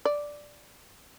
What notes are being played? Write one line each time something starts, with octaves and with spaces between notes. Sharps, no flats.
D5